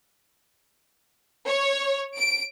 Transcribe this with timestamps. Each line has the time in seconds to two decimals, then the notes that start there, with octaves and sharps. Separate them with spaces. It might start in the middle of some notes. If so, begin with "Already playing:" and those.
1.46 C#5
2.17 D7